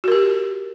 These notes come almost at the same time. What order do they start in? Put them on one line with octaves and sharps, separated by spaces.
F#4 A#4 G4